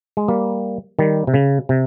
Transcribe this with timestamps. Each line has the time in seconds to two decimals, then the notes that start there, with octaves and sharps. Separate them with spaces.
0.17 G#3
0.28 G3 A#3
0.99 D#3 G3
1.27 C3
1.34 C#3
1.69 C3